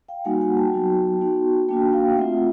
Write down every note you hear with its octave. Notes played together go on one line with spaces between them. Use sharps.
F5 G5
G3 A#3 D#4 F#4 F#5 G#5
F#5 G#5
G5 A5
F#3 B3 D#4 F#4
B3 D#4 F#4
A#3 D4 F#4 G5 A5
F5 G5
A3 C4 F4 E5 F#5